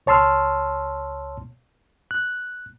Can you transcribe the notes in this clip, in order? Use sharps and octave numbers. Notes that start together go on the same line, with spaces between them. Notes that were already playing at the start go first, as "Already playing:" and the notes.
C#2 C#5 A5 C6 E6 F6
F#6